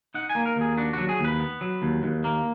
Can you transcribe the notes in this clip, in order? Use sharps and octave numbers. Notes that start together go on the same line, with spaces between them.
D#4 F#5
G#5
A#3
A#4
D#2 G#4
D4 F#4
F#3 F#4
G#4
D#2
B4
B3
F#3
D#2
D#2
A#3